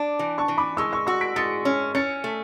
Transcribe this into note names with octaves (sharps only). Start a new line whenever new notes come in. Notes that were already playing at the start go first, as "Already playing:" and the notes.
Already playing: D4 D6
E3
A5 C#6
E3
B5 D6
G#3 C#6 E6
C#6 E6
F#4 C#6 E6
B6 D7
G#3 A6 C#7
C#4
C#4 A6 C#7
A3